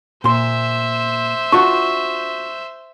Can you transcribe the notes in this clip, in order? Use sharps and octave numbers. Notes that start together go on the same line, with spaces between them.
A#2 C5 E5 C6
D4 F4 F#4 C#6